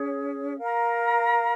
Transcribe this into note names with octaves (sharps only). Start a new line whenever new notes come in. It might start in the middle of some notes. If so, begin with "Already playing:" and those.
Already playing: C#4 G#4 C#5
A#4 F5 A#5